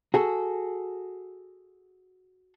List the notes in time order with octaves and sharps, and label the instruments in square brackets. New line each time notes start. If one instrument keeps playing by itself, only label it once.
[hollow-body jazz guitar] F#4 G#4 A4